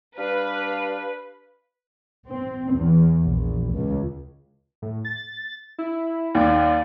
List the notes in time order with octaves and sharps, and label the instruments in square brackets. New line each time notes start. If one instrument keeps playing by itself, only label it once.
[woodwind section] G3 D4 F5 [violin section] B4
[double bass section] C4
E2
A#1
C#2
[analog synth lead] A2
A6
E4
[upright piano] D#2 [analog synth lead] D5